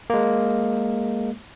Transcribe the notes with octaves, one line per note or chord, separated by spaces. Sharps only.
G#3 A#3